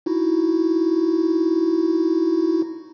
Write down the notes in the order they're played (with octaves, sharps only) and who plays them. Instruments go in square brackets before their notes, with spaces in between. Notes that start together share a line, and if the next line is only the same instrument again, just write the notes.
[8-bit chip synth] D#4 E4 F#4